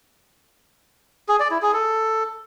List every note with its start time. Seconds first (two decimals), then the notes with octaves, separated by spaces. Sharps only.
1.29 G#4
1.40 D5
1.51 E4
1.62 G#4
1.73 A4